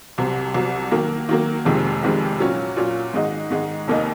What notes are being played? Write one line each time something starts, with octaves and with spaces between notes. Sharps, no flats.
C2 C3 F#3
C2 C3 F#3
D#3 F#3 A#3
D#3 F#3 A#3
F1 F2 C3 D#3 G#3
F1 F2 C3 D#3 G#3
A#2 F#3 C#4
A#2 F#3 C#4
G#2 D#3 G#3 D#4
G#2 D#3 G#3 D#4
F1 D#2 D#3 A#3 D#4